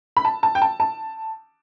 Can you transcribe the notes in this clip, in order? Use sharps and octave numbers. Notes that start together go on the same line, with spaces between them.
B5
A5
A5
G5
A5
A5